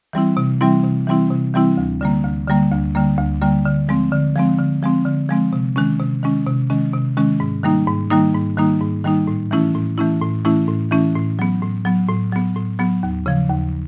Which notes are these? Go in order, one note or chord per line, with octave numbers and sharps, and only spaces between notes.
E3 G3 C4 E4
C3
E3 G3 C4 E4
C3
E3 G3 C4 E4
C3
E3 G3 C4 E4
D2
D3 G3 A#3
D2
D3 G3 A#3
D2
D3 G3 A#3
D2
D3 G3 A#3
D3
F3 G#3 C4
D3
F3 G#3 C4
D3
F3 G#3 C4
D3
F3 G#3 C4
C3
D#3 G#3 C#4
C3
D#3 G#3 C#4
C3
D#3 G#3 C#4
C3
D#3 G#3 C#4
G#2
D#3 G3 A#3 D#4
G#2
D#3 G3 A#3 D#4
G#2
D#3 G3 A#3 D#4
G#2
D#3 G3 A#3 D#4
A2
E3 A3 C#4 E4
A2
E3 A3 C#4 E4
A2
E3 A3 C#4 E4
A2
E3 A3 C#4 E4
A2
F#3 B3
A2
F#3 B3
A2
F#3 B3
A2
F#3 B3
D#2
C#3 F3
D#2